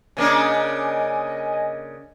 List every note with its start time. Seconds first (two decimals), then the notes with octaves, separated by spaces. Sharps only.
0.17 C#3 A#3 D4 D#5 G#5